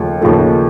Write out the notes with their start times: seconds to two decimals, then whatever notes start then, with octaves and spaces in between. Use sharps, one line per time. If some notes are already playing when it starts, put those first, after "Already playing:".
Already playing: D#2 C#3 F3 A3
0.21 D#2 C#3 F3 A3